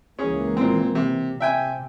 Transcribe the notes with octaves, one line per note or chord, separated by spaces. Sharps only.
C#2 E3 A#3 C#4 G#4
A#2 C4
C3
C3 E5 G5 G#5